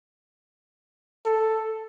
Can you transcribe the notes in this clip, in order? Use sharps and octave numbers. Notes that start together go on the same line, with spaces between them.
A4